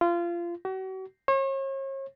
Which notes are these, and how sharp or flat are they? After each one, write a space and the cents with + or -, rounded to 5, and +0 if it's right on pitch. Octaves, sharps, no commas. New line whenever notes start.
F4 -25
F#4 +40
C#5 -40